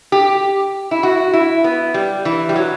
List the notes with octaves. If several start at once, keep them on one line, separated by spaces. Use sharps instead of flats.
G4
E4
F#4
E4
B3
G3
E3
G3
F#3